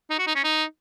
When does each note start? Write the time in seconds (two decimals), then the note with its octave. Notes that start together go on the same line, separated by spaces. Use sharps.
0.10 D#4
0.19 F#4
0.27 D#4
0.35 C#4
0.44 D#4